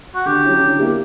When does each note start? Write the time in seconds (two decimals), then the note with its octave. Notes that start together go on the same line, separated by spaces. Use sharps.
0.15 F#4
0.25 D3 G4
0.44 F#3 C#4 E4
0.61 D3
0.79 A#3 E4 G4